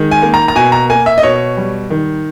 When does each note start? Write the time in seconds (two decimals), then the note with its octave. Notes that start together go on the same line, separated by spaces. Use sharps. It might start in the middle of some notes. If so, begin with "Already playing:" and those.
Already playing: D#3 G#3
0.11 G#5
0.22 A#3
0.34 A#5
0.48 A#5
0.55 B2 G#5
0.72 A#5
0.90 A#3 G#5
1.06 E5
1.18 D#5
1.23 B2 C#5
1.57 G3
1.90 D#3